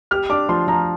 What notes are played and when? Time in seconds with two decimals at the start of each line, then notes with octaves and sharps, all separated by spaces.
0.11 G4 F6
0.30 D4 D6
0.49 F3 C6
0.68 F3 A#5